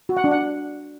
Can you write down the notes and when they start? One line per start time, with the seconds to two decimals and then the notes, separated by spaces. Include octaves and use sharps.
0.09 F#4
0.17 F#5
0.24 D4
0.31 F#5